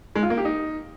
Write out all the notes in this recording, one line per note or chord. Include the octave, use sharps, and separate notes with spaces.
G#3
F4
A#3
G4
D#4